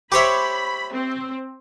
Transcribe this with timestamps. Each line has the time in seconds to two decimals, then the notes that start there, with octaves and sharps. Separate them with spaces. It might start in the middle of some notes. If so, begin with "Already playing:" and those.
0.12 G4 C5 C#5 E5 B5 C#6 D6
0.93 C4